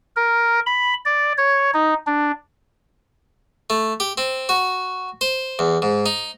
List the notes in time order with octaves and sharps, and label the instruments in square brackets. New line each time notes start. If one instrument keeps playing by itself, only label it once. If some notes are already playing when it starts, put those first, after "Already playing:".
[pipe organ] A#4
B5
D5
C#5
D#4
D4
[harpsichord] A3
G4
C4
F#4
C5
E2
G#2
D#4